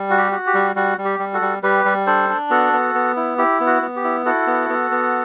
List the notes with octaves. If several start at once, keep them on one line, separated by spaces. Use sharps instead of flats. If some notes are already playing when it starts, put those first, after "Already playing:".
Already playing: G3
F#4
G4
F#4
G4
G3
G3 F#4
G3
G4
G3
F#4 A4
G3
G3 G4 B4
G3
D4 A4 C5
D4
B3 F#4 A4
B3
B3
E4
E4 G4
B3
F#4
B3
G4
E4
E4 F#4 A4
B3
B3
B3